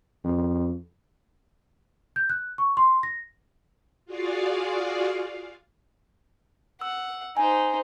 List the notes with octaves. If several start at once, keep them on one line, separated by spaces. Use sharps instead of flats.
F2
G6
F#6
C#6
C6
A#6
F4 F#4 G#4 D5 F5
F#5 E6
D#4 C5 G#5